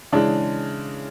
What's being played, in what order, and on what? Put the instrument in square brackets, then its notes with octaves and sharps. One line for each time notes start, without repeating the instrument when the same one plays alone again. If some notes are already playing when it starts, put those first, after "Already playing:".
[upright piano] C#3 E3 G#3 D4